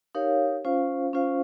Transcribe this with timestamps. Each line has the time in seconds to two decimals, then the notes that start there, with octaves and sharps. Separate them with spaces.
0.15 D#4 G4 A#4 C#5 F5
0.65 C#4 F4 C5 F5
1.13 C#4 F4 C5 F5